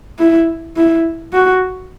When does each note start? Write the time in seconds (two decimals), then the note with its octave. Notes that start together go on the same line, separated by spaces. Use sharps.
0.19 E4
0.77 E4
1.33 F#4